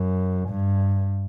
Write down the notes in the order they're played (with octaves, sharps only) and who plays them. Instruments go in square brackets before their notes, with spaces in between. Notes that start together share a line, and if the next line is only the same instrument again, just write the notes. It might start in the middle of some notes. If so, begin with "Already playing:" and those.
Already playing: [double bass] F#2
G2